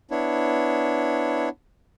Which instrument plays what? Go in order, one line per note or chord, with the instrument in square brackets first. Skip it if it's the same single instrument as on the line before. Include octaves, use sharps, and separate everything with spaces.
[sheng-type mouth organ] B3 D4 E4 C#5